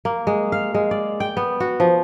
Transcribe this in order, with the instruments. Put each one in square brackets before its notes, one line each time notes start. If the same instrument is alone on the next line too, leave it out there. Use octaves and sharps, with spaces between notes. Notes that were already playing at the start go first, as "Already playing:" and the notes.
[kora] A#3
G#3
F5
G#3
D5
G5
B3
F#4
F3